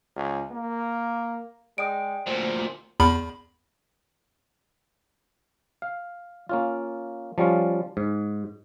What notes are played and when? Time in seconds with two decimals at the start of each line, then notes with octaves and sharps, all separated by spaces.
0.16 C#2
0.51 A#3
1.78 G#3 D5 G5 D#6 D7
2.26 D2 A#2 A#4 C5
3.00 E2 B5
5.82 F5
6.49 A#3 C#4 F4
7.38 F3 G3 C#4 F4
7.97 G#2